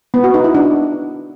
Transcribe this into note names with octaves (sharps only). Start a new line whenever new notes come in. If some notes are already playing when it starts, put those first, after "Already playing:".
B3
F#4
D#4
E4
D4